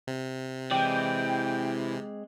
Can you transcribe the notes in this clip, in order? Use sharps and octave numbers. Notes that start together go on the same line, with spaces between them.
C3
E3 G#3 C4 D5 G5